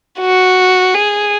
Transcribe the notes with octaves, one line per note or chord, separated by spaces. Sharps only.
F#4
G#4